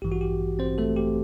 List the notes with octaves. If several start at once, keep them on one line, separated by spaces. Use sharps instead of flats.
A1 G2 E3 G4
F#4
G4
C4 C5
A3 A4
G4